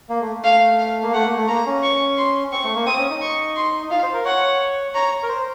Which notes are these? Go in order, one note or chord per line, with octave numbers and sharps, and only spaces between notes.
A#3
A3
A3 F5
F5
A#3
A3 F#5
A#3
A3
A#3 A#5
C#4
C#6
C6
C4 C#6
A3
A#3
C4 D#6
C#4
D#4
C#6
C6
D#4
F4 F5
C5
A#4
C#5 F#5
C#5 A#5
A#4
C5